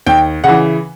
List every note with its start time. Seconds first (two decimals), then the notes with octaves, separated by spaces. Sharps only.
0.07 D#2 G5
0.44 C#3 E3 F#5